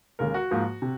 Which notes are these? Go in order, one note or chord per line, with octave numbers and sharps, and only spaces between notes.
D#2 C#3 G#3 A#4
F#4
G#2 F3 A#3
C3